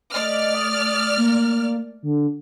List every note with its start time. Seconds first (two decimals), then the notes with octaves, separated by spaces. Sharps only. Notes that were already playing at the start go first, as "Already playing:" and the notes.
0.13 A3 D5 D#5 F6
0.55 D#6
1.18 A#3
2.03 D3